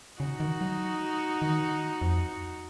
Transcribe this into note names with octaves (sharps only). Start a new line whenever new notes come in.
C#3 D#4 F#4
D#3
F#3
D#3
F2